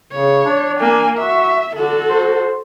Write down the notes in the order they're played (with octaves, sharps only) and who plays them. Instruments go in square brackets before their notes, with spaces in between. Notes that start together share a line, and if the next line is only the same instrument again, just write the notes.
[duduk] C#3 [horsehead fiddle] C#5
[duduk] D4
[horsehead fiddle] A#3 G#5
[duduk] F#4 [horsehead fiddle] E5
[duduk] D3 [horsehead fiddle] F#4 A4
[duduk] C5